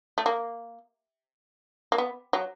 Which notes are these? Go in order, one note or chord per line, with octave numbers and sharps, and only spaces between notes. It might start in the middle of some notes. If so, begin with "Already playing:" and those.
A3
A#3
A#3
B3
F#3